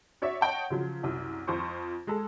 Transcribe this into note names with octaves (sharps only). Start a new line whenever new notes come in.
F#4 C#5 D5 E5
C#5 D#5 F#5 G5 A5
C#3 F3 F#3
C2 F#2
F2 F4 C5 C#6
G#3 G#4 A4